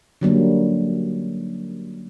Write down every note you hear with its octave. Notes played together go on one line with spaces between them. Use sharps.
D3 F#3 G3 A#3